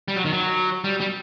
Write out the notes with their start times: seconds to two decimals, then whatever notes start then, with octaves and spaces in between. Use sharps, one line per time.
0.08 G3
0.16 F#3
0.25 D#3
0.33 F#3
0.84 G3
1.00 G3